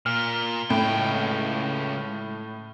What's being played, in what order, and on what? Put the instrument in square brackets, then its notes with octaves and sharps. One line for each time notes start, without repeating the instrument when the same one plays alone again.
[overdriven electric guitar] A#2 [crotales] F6
[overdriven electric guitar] C#2 G5 [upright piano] A2